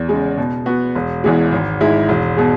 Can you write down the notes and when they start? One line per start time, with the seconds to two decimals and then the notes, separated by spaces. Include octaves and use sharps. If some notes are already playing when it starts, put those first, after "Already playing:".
Already playing: E2
0.09 C#3 G#3
0.37 B2
0.66 B3 F#4
0.95 E1
1.24 E2 E3 G#3
1.52 G#1
1.80 G#2 G#3 E4
2.09 E1
2.37 B2 G#3